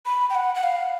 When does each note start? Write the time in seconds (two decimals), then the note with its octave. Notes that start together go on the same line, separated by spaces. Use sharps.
0.06 B5
0.30 G5
0.35 F#5
0.55 F#5
0.63 F5